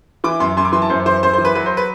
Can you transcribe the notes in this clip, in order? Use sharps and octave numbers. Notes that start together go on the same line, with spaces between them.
E3 D6
F#2 C6
F#2 C6
D6
E3 C6
A5
F#2 C5
E3 C5
F#2 C5
C5
E3
B4
F#3 B4
C5
B4